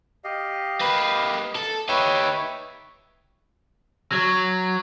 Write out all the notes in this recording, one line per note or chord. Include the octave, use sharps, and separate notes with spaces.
G4 D#5 F5
A#3 B4
A4
D#4 G4 B4 C#5 E5
F#3